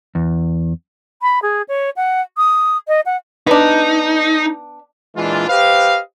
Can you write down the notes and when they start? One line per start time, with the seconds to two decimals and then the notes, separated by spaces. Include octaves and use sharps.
0.15 E2
1.22 B5
1.42 G#4
1.68 C#5
1.96 F#5
2.37 D#6
2.88 D#5
3.05 F#5
3.47 B3 D4 D#4
5.16 A#2 E3 G#3 D4 F4
5.48 G4 B4 C5 D#5 F5